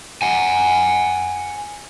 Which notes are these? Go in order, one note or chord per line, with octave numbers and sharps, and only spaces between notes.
F#5 G#5